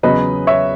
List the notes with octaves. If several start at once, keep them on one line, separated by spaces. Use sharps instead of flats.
E2 C#3 F#3 B3 B4 D#5
C#5 E5